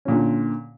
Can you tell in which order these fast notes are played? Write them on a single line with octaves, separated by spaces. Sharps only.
C#4 A#2 D3